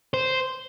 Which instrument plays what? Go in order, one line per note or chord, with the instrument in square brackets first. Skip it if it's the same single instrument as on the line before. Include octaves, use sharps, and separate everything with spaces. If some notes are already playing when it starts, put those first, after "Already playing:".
[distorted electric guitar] C5